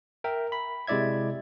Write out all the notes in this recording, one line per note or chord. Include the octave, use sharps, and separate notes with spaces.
A#4 E5 G5
B5
C3 G#3 E4 D5 E5 G#6